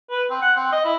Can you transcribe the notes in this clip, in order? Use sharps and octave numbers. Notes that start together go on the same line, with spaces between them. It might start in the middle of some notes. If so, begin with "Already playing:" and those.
B4
C4
F#5
C4
D#5
E4